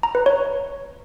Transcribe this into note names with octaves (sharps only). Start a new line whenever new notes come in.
A#5
B4
C#5